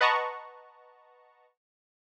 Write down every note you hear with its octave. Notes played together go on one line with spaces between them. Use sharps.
B4 D#5 F#5 A5 A#5 C#6